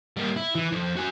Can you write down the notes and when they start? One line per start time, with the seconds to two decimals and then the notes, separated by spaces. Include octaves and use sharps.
0.17 G3 A#3
0.36 E4
0.55 E3
0.72 F2 F3
0.97 F#4 G#5